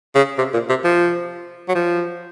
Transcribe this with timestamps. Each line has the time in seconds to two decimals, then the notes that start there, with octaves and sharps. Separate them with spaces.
0.15 C#3
0.38 C3
0.53 A#2
0.69 C3
0.84 F3
1.68 F#3
1.75 F3